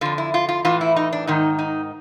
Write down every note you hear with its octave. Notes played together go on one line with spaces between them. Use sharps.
F2 D3 F4
E4
F4
F4
A2 E3 F4
E4
D#4
D4
G#2 D#3 D#4
D#4